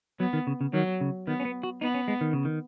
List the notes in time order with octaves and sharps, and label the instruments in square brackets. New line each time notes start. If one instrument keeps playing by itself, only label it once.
[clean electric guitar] F#3 [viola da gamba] B3
[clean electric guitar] D#3
C#3
C#3
[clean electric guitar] D#3 [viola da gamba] F#3
[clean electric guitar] C#3
[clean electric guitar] D#3 [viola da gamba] B3
[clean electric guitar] C#4
B3
F#4
[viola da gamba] B3 [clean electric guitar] D#4
[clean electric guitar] C#4
G#3
D#3
C#3
D#3